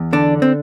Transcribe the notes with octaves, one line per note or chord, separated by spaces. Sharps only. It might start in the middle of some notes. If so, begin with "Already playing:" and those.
Already playing: E2
D3 D4
C4